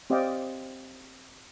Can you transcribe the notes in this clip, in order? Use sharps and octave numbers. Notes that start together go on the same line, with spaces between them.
C4 G4 D5 D#5 F5 G5